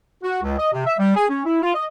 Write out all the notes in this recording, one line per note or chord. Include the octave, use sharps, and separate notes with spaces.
F#4
C#2
D#5
C3
E5
G3
G#4
C#4
E4
F4
D#5